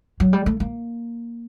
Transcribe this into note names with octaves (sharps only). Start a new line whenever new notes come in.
F#3
G3
A3
A#3